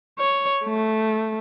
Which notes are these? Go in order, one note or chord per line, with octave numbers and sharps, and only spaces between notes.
C#5
A3